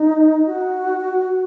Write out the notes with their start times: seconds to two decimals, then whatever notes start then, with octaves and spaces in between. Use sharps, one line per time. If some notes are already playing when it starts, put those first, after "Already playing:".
Already playing: D#4
0.47 F#4